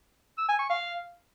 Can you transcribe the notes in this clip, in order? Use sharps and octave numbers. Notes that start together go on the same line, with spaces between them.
E6
G#5
C#6
F5